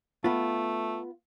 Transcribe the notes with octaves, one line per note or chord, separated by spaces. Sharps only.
A3 B3 F4